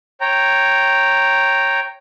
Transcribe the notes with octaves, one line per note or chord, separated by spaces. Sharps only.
C#5 G5 A#5